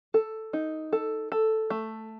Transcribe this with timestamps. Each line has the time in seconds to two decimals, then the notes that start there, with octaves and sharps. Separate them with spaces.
0.14 A4
0.53 D#4
0.93 A4
1.32 A4
1.70 A3